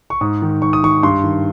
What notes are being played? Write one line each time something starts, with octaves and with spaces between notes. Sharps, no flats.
C#6
G#2 D#6
D#3
G#2 C#6
D#6
D#3 C#6
G2 C6
D#3